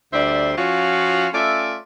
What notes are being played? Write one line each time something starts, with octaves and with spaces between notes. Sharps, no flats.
D2 D3 G3 C5 D5 E5
F3 C#4 F4 F#4 C#5 F5
A3 C#4 F4 D5 E5